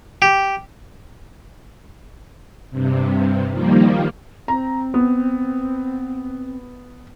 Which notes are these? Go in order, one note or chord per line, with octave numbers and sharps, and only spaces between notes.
G4
G2 C3
D#3 F3 G3 A#3
C4 A#5
B3